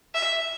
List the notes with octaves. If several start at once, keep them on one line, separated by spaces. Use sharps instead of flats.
E5